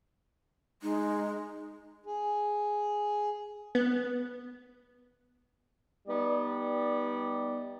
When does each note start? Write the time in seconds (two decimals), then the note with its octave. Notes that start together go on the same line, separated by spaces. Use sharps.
0.82 G#3 D#4
2.06 G#4
3.75 B3
6.08 G3 B3 D#4 D5